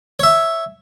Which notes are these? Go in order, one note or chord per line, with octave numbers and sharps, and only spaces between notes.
C#5 E5